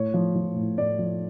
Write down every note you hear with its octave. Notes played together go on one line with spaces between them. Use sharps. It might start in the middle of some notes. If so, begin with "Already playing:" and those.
Already playing: A2 C#5
F3
F3
A2
A2 D5
F3